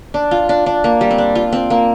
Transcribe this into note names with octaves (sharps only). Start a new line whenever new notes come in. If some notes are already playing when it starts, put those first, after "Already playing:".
D4
F4
D4
D4
A#3
G3
C4
D4
F4
C4
A#3